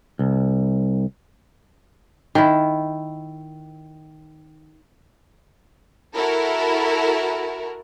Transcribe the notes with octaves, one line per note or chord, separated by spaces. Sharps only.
C2
D#3 E4
E4 F#4 A4 A#4